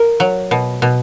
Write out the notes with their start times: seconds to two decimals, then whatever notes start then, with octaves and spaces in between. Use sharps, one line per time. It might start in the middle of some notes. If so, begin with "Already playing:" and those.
Already playing: A#4
0.20 F#3
0.51 B2
0.82 B2